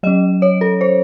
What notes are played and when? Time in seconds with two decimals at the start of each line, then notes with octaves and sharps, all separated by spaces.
0.03 F#3 D#5
0.07 C#4
0.42 C#5
0.61 A4
0.81 C5